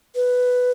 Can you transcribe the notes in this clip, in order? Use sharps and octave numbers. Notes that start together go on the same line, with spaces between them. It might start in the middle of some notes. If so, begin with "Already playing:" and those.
B4